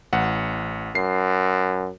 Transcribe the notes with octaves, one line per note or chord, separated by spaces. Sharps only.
A1 F#5
F#2 C7